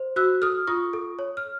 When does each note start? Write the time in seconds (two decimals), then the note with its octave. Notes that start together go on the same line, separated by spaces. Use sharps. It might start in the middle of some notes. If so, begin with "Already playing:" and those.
Already playing: C5
0.16 F#4 E6 F#6
0.42 A4 D#6 F6
0.67 F4 C#6 D#6
0.93 A4
1.19 C#5
1.37 F6